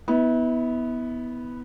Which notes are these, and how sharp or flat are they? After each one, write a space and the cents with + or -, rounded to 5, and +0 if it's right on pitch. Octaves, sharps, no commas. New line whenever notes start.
B3 +0 E4 -35